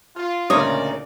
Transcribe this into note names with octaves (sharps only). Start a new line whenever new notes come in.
F4
D2 A#2 C#3 D#4 A#4 C#5 D5 D#6